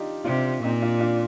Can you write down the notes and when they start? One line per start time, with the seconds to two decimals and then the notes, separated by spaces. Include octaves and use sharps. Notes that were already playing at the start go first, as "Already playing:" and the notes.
Already playing: D4 D#4 F4 G4
0.24 C3 D4 F4
0.63 A#2 C4 D#4
0.82 D4 F4
1.00 D4 F4